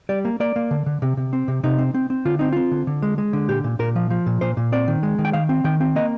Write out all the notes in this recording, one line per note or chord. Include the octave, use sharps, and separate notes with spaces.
G3 D5
A#3
A#3 D5
A#3
D3
D3
C3
C3
C4
C3
C3 D#4
C4
C4
C4
D3 F4
C4 D#4
C4 F4
D3
D3
G#3
G#3
D3
A#2 G4
A#2
A#2 A#4
F3
F3
A#2
A#2 C5
A#2
C4 D5
D#3
G#3
D#3
G5
D#3 F5
C4
D#3 G5
C4
A#3 D#5